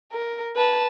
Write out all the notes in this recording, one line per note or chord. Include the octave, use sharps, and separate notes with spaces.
A#4
B4 A5